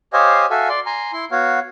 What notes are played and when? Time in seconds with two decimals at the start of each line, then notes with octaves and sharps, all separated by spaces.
0.13 G4 C5 C#5 D#5 F5 G#5
0.50 F#4 A4 E5 F5 G#5
0.69 D5 C6
0.86 G#5 A#5 C6
1.13 E4 C6
1.31 B3 F#4 C#5 F5